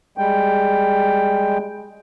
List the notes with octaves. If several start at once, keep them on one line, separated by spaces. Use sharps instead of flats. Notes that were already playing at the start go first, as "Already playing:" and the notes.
G3 G#3 G5